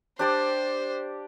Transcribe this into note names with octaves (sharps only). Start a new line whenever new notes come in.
D4 G4 C5 D5